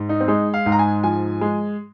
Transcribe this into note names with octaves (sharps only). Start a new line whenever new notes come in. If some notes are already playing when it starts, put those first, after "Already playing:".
Already playing: G#2
D#4
C4
G#3 D#4
F5
G#2
A#5
G#5
F3 G#5
G#3